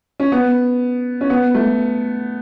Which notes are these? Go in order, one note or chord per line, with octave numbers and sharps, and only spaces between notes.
C#4
B3
C#4
B3
A3